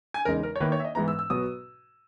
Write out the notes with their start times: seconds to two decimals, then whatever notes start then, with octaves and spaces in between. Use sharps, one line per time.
0.14 G#5
0.25 E2 C#3 G#3 D#4 A#4
0.43 A#4
0.56 C#5
0.60 D#3 A#3 E4 B4
0.72 C#5
0.80 E5
0.85 D#5
0.95 G#2 E3 G#3 B3 A#5
1.08 E6
1.19 E6
1.30 B2 F#3 B3 F#4 B4 D#6